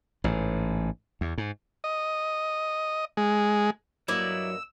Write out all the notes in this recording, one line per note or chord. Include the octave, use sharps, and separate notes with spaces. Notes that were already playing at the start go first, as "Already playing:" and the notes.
A1 G#2
E2
G#2
D#5
G#3
G2 F#3 A#3 E4 D5 D#5 E6